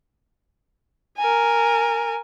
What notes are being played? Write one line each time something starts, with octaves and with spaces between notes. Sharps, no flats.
A#4 G#5